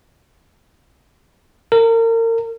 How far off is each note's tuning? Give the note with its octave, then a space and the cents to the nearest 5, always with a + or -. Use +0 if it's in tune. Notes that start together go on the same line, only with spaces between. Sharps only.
A#4 -35